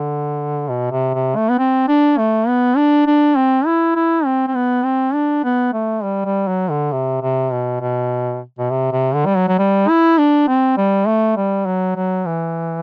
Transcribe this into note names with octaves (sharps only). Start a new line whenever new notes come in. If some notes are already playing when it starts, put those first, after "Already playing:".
Already playing: D3
B2
C3
C3
A3
B3
C4
D4
A3
B3
D4
D4
C4
E4
E4
C4
C4
B3
C4
D4
B3
A3
G3
G3
F#3
D3
C3
C3
B2
B2
B2
C3
C3
D3
G3
F#3
F#3
G3
E4
D4
C4
G3
A3
G3
F#3
F#3
E3